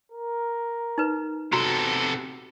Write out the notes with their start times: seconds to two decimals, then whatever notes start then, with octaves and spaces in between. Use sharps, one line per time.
0.12 A#4
0.98 D#4 B4
1.53 C3 B3 F#4 A4 A#5 C6